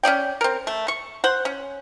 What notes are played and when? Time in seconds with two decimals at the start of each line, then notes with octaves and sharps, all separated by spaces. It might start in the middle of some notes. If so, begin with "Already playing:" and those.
0.03 C#4 D#4 D5 G5
0.41 C4 A#4
0.67 A3
0.88 C#6
1.24 C5 F#5
1.45 C#4